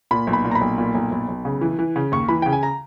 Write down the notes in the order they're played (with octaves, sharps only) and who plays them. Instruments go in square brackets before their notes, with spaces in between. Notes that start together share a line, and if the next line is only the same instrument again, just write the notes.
[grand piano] A#2 B5
B1
B5
A#2
A#5
B5
B1
A#2
B1
B1
B1
C#3
E3
E3
C#3
D#2 C#6
E3 B5
C#3 G5
G#5
A#5